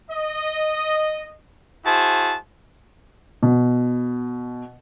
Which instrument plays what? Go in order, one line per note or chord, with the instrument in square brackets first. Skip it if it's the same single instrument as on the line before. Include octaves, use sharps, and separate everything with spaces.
[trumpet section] D#5
E4 F#4 G#4 C5 A5
[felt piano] B2